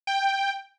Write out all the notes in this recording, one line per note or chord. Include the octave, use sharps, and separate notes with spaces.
G5